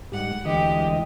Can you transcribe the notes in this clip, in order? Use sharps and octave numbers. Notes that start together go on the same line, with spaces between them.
G#2 G3 F#5
D2 E3 G#3 G4 D#5